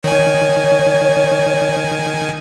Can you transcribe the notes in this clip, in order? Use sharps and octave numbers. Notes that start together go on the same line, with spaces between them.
D#3 C#5 G#5